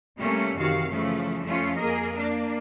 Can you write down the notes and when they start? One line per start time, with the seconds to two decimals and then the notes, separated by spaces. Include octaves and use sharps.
0.17 C3 G3 A3 A#3 C#4
0.56 F#2 C3 D#3 E3 F#4 F5
0.90 C#3 E3 F3 A3
1.42 F2 F3 A3 C#4 F4
1.76 F2 A#3 G#4 A#4 D#5
2.15 A#3 D4